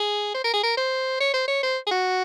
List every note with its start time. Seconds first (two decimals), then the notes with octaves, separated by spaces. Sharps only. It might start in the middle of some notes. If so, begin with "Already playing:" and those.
Already playing: G#4
0.34 C5
0.44 A#4
0.53 G#4
0.63 A#4
0.77 C5
1.20 C#5
1.34 C5
1.48 C#5
1.63 C5
1.87 G#4
1.91 F#4